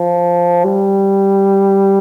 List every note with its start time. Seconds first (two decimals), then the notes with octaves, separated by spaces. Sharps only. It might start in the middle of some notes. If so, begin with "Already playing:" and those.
Already playing: F3
0.64 G3